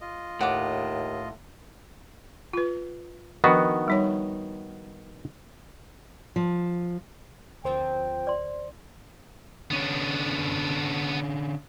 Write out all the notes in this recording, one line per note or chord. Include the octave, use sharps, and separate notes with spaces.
F4 D#5
D#2 A2 F#5 D6
F4 B4
D#3 F3 B3 D4 D#4 F#4
G3 D#4 C#5
F3
D2 F3 C4 A#4 C5 G5
D5 C6
D3 B3 C#4 D4